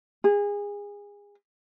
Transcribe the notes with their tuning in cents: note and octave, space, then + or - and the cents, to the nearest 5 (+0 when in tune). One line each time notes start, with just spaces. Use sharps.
G#4 -25